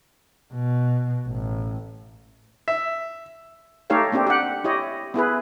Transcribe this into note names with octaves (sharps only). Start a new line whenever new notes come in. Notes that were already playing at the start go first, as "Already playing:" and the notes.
B2
A1
E5
A3 D#4 G4 A4 C#5 F5
A#3 C4 D4 G4
G4 F#5
E4 G4 C#5 D#5
B3 E4 G#4 B4